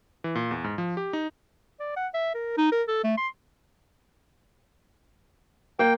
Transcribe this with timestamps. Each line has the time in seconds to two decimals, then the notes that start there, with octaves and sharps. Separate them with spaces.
0.24 E3
0.35 A#2
0.51 E2
0.64 G#2
0.78 F3
0.97 G4
1.13 D#4
1.80 D5
1.97 F#5
2.14 E5
2.35 A#4
2.57 D#4
2.72 A#4
2.88 A4
3.04 A3
3.17 C6
5.79 A#3 G5